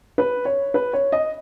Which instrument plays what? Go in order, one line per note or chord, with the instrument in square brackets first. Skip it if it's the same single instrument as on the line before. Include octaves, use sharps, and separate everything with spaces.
[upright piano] B4
C#5
B4
C#5
D#5